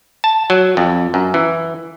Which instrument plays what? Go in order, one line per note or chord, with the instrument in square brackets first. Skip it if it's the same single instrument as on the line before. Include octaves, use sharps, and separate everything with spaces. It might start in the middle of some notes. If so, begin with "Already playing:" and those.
[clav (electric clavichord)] A5
F#3
F2
F#2
E3